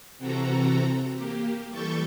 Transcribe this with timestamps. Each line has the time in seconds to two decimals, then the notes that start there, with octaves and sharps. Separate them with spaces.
0.18 C3 E3 C4 F#4 A4 A#5
1.14 A#3 G4
1.70 E3 G3 A4 C#6 G6 A6